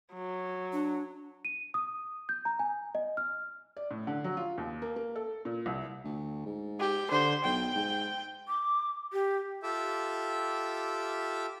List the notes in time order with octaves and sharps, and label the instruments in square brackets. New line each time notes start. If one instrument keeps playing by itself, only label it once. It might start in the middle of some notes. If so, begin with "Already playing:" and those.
[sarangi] F#3
[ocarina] D4
[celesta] D#7
D#6
G6
A#5
G#5
D#5
F6
[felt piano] D5
A2
D3
F#3
F4
D#2
A#3
A#3
A4
A#2
C2
[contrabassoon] D2
G#2
[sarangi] G4
[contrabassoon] D3 [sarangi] C5
[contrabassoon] B1 [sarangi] G5
[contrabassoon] G#2
[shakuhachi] D6
G4
[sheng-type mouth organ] F4 G4 A4 E5 D6 E6